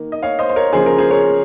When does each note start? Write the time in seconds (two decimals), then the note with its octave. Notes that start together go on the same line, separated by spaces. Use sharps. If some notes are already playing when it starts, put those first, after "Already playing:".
Already playing: D#3 A#3
0.12 D#5
0.23 C#5 F5
0.39 C5 D#5
0.49 C5
0.56 A#4 C#5
0.73 C#3 F3 A#3 G#4 C5
0.86 A#4
0.98 G#4 C5
1.11 A#4 C#5